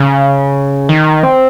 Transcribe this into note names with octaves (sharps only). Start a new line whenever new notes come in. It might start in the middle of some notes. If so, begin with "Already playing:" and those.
Already playing: C#3
D#3
C4